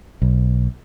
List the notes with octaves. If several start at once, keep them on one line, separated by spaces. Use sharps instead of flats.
B1